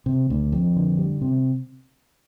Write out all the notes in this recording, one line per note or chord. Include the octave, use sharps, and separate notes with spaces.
C3
D2
F2
D3
G3
C3